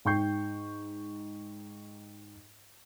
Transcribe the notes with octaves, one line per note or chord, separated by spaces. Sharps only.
G#2 G5 C#6 G6 C7